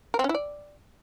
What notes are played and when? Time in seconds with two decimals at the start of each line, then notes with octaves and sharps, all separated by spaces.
0.14 A#4
0.19 C4
0.24 C#4
0.29 E4
0.34 D5